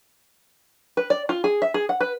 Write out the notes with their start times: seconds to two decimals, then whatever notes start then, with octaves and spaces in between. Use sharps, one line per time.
0.97 B4
1.10 D5
1.29 F4
1.44 G#4
1.62 E5
1.74 G#4
1.89 F#5
2.01 B4